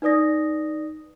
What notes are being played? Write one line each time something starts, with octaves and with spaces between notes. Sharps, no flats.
D#4 B4 D5 D#6 A#6